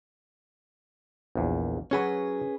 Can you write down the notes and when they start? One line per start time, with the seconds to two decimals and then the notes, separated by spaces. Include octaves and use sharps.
1.36 A#1 E2
1.91 F#3 C#4 F#4 G#4 B4 C#5